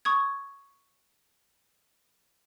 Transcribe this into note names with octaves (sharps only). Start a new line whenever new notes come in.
C#6 D#6 G#6